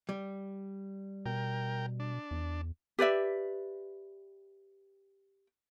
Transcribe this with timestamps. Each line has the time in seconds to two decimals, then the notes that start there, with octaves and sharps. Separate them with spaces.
0.09 G3
1.26 B2 A#4 G5
2.00 D4
2.31 E2
2.99 G4 B4 D5 E5